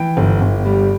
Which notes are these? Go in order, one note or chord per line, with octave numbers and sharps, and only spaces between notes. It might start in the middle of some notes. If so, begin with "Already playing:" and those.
Already playing: E3 G5
G1
G1
G3